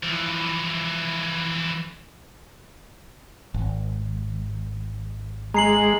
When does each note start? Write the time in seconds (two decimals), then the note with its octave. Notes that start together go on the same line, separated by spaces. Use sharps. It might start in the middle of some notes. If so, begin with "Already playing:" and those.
0.03 E3 F3
3.54 G#1
5.54 G#3 A#5 C7 F#7